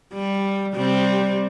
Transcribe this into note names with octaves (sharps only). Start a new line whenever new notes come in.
G3
C3 G3 C4